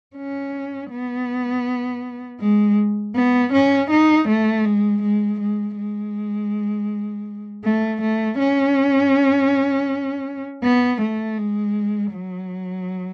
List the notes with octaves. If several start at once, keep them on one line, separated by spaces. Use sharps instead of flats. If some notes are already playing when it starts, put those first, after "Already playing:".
C#4
B3
G#3
B3
C#4
D#4
A3
G#3
G#3
G#3
G#3
A3
A3
C#4
B3
A3
G#3
F#3